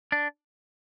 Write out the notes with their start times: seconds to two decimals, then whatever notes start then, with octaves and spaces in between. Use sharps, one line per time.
0.12 D4